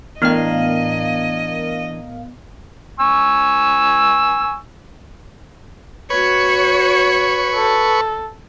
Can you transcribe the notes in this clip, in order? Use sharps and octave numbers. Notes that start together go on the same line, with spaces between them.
A2 E3 B3 D4 A#4 D#5 F5 G5
G#5 C#6 E6
F#4 B4 C#5 C#6
A4